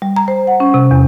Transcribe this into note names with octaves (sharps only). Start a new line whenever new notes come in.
G3
A#5
C5
F#5
C#4
C3
E2